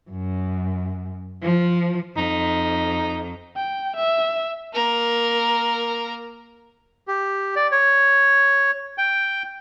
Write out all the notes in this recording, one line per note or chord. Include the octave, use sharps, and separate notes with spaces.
F#2
F3
F2 D#4
G5
E5
A#3 A#4
G4
D5
C#5
G5